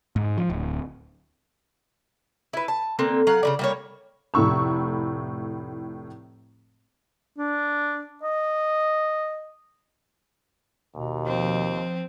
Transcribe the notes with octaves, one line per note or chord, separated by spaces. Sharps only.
G#2
F3
D1
E4 B4
A5
D3 A#3 C4
F#3 F5 F#5
C#3 G3 D5
G3 A#3 C#5
F1 A2 E4 C#6 E6
D4
D#5
D#2 B2
F3 C4